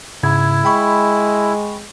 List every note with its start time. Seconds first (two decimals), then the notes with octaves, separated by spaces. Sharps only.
0.23 G#2 C#3 E4 G#6
0.65 G#3 G5 B5 C#6